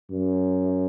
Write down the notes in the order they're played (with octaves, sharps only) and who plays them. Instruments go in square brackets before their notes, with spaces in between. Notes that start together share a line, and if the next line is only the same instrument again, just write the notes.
[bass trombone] F#2